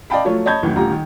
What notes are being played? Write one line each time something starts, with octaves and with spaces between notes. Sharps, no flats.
D5 D#5 F5 G5 A5 B5
F3 F#3 A3 F4 C#5
C#5 D#5 A5 B5 G6 G#6
F#1 D2 D#3 E3
D#1 D2 F4 G4 A#5
D#3